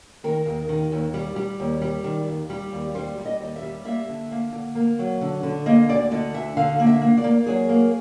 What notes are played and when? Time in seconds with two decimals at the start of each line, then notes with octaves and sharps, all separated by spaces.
0.24 D#3 A#4
0.46 D#2
0.69 D#3
0.92 D#2
1.14 G3
1.36 G3
1.60 D#2
1.82 G3
2.04 D#3
2.28 D#2
2.50 G3
2.72 D#2
2.95 G3 C5
3.18 G3
3.25 D#5
3.40 D#2
3.56 E5
3.63 G3
3.85 A#3 E5
4.09 D3
4.31 A#3
4.53 D3
4.75 A#3
4.99 F#3
5.21 D3
5.43 D3
5.66 A#3 D#5
5.89 D2 D5
6.11 D3 D#5
6.34 D2 E5
6.57 D3 F5
6.80 A#3
6.86 E5
7.01 A#3
7.17 D5
7.24 A#3
7.46 F#3 G#4
7.69 A#3